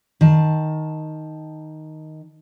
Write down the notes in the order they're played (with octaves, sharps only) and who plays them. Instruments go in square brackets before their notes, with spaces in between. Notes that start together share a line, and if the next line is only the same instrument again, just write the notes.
[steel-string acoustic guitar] D#3 A5